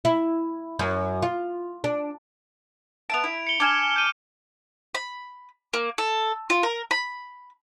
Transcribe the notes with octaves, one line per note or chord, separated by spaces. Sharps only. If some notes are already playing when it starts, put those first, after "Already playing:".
E4
F#2
F4
D4
B3 E5 A5 D7 F7
E4
C#7 G7
D4 G#5 D6 F6 E7
G6 D#7
B5
A#3
A4
F4
A#4
B5